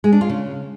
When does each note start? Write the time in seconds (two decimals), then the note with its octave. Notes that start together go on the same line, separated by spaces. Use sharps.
0.04 G#3
0.12 D4
0.21 F4
0.29 C#3